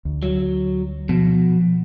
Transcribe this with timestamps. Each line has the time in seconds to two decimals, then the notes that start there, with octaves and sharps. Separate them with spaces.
0.05 D2
0.23 F#3
1.09 B2 F3